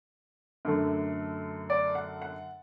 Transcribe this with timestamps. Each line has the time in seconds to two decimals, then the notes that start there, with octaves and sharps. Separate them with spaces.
0.65 F#2 D3 A3
1.70 D5
1.95 F#5
2.22 F#5